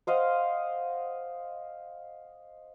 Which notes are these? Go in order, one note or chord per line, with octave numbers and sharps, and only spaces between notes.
C5 D#5 F5 F#5